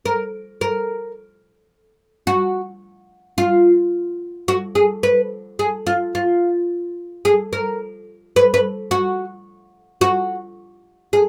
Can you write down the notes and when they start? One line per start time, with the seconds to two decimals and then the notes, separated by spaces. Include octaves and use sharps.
0.05 A#4
0.61 A#4
2.27 F#4
3.38 F4
4.48 F#4
4.75 G#4
5.03 B4
5.59 G#4
5.87 F4
6.15 F4
7.25 G#4
7.53 A#4
8.36 B4
8.54 B4
8.91 F#4
10.01 F#4
11.13 G#4